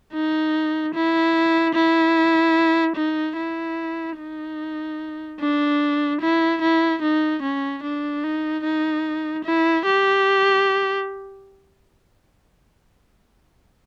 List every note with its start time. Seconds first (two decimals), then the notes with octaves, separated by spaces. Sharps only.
0.13 D#4
0.94 E4
1.75 E4
2.96 D#4
3.37 E4
4.18 D#4
5.40 D4
6.21 E4
6.62 E4
7.02 D#4
7.43 C#4
7.84 D4
8.23 D#4
8.64 D#4
9.45 E4
9.85 G4